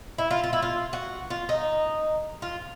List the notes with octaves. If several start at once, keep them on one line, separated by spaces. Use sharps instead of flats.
E4
F4
F4
E4
F4
F#4
F4
D#4
F4